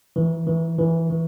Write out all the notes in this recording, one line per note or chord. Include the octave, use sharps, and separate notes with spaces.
E3
E3
E3
E3